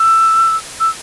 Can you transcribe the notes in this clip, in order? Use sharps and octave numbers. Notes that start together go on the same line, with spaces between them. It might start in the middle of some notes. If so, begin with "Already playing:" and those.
Already playing: E6
E6